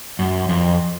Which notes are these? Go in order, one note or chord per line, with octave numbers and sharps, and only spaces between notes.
F#2
F2